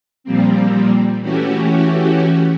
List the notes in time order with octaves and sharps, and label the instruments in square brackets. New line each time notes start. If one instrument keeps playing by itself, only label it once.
[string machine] A#2 F3 G3 A#3 C4
E3 A3 C#4 F#4 G4